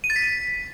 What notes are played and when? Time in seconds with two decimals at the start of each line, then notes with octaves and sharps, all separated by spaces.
0.04 D#7
0.10 A6
0.16 B6